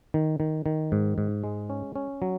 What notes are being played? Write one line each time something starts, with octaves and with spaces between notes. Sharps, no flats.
D#3
D#3
D#3
G#2
G#2
G#3
C#4
C#4
F#3